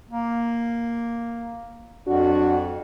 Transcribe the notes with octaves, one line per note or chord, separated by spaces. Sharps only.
A#3
F2 F#3 D4 F#4